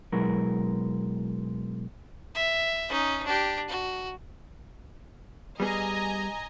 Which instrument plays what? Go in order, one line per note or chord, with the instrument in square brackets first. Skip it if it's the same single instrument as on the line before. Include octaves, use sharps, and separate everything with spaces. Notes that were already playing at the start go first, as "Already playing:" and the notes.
[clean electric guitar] B2 F#3 G#3 E4 A#4
[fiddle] E5
C#4 D#4
D4 G4
F#4
[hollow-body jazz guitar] G3 B3 G#4 [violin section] D#5 G#5 A#5